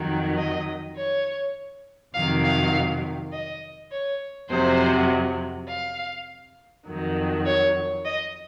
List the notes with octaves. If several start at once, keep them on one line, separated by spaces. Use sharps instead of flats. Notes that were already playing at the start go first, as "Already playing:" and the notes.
Already playing: F2 D#3 F#3
D#5
C#5
F2 C3 D#3 F#3 F5
F5
D#5
C#5
F2 C3 F#3 C5
F5
F2 D#3 F#3
C#5
D#5